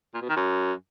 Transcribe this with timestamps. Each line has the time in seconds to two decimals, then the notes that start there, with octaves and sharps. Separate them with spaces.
0.14 A#2
0.21 B2
0.29 D#3
0.36 F#2